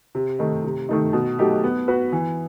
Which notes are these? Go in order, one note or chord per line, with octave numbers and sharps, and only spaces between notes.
C3
D#3 A3 D#4
C3
D#3 A3 D#4
B2
F#3 A3 D#4 G4
B3
F#4 B4
E3